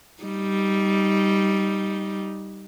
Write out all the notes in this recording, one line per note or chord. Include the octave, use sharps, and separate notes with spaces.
G3 D#4